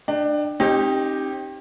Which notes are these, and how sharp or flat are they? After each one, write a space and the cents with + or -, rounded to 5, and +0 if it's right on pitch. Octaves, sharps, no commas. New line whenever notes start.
D4 +25 G5 +0
C4 +45 D#4 +0 G4 +0